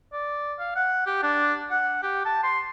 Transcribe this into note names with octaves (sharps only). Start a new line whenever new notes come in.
D5
F5
F#5
G4
D4
F#5
G4
A5
C6